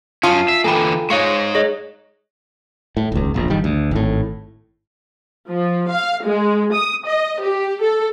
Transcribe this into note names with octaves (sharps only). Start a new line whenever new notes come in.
F#2 C#4 F4 A5 D#6 F6
E5 C7
D3 E3 A#3 A4 G5 G#5 A#5 B5
G#3 D#4 C#5 F5 C#6 C#7
G#4 C#5 D#5 A#6
A2
D#1 C#2
E1 A#1
G1 D#3 G3
D2
G#1 A2
F3
F5
G#3
D#6
D#5
G4
A4